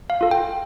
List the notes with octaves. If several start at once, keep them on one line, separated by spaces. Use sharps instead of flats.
F5
F4 A4
G5